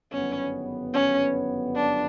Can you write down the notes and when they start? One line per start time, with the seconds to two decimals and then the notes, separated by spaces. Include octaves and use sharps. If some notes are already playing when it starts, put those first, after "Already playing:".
0.12 G1 F#2 D#3 G3 B3 C#4
0.94 C#4
1.76 D4